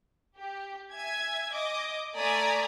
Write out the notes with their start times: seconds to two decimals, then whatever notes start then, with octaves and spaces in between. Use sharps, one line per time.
0.37 G4
0.93 E5 G#5 G#6
1.54 D#5 D6
2.15 A3 D5 G#5 A#5 D#6 B6